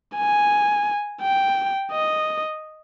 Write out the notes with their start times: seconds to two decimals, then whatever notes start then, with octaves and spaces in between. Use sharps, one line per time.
0.16 G#5
1.22 G5
1.92 D#5